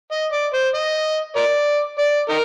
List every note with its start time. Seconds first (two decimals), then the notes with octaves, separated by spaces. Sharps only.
0.11 D#5
0.32 D5
0.53 C5
0.74 D#5
1.36 A#4 D5
1.98 D5
2.30 D#4 A#4